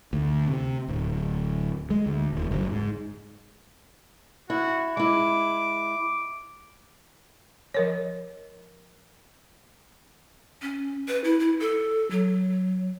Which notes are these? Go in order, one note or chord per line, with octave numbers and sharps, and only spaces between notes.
D2
C3
D1
G#3
D2
D#1
F#1
G#2
E4 F#4
G#3 E4 D6
F3 A#4 C#5
C#4
B4
E4
E4
A4
F#3